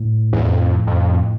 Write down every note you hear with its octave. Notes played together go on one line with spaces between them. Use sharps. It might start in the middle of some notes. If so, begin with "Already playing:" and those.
Already playing: A2
E2
F2
F2